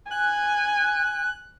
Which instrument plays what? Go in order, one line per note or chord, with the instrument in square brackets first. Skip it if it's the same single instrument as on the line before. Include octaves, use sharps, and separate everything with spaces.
[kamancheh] G#5 [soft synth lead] F#6